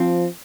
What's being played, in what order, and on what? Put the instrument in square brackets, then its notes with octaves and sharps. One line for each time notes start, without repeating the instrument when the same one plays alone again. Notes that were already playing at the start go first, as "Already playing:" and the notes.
Already playing: [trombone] F3 [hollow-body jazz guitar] C4